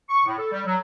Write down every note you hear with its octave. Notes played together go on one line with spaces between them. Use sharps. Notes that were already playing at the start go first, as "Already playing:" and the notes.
C#6
A2
A4
G3
F#3